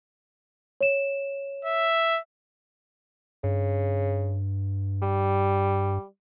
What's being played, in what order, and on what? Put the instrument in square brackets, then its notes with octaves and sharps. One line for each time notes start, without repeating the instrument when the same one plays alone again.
[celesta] C#5 E7
[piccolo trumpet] E5
[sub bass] G2 [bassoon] C#3
[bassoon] G3